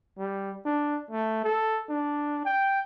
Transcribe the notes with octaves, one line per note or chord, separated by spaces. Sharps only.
G3
D4
A3
A4
D4
G5